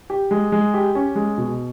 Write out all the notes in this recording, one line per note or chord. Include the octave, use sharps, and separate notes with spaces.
G4
G#3
G#3
G4
C#4
G#3
B2